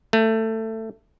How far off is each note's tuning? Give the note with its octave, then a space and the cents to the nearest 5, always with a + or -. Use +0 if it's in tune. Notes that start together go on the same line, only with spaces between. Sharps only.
A3 +15